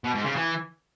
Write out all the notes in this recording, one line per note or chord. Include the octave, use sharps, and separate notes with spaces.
B2
G#2
C#3
E3